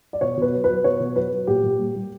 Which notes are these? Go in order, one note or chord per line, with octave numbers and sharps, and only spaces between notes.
D5
B2 C#5
B2 B4
F#3
F#3 B4
B2 C#5
B2
F#3 B4
F#3
A#2 G4
A#2
G3
G3